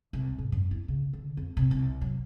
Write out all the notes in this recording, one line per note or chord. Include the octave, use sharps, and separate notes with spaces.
C2
G#2
F#2
E4
C#3
D3
F2
C3
C2
F#3